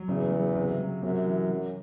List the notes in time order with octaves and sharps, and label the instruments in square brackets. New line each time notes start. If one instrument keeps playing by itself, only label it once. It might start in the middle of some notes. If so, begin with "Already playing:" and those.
Already playing: [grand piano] F#3
[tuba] E2 [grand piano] C#3
[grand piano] F#3
C3
F#3
[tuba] F#2 [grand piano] C3
[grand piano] E3
F#3